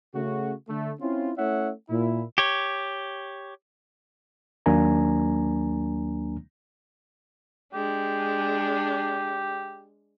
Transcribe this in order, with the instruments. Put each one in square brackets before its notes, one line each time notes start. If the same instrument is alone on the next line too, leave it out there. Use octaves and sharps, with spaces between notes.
[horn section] C#3 A3 F#4
D3 A3
C4 C#4 E4 F4
A3 C#4 E4 C#5 E5 F#5
A#2 E4
[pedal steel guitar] G4 C#5
[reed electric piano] D#2 F#3 A#3 D4 G#5 A#5
[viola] G#3 D4 [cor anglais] G4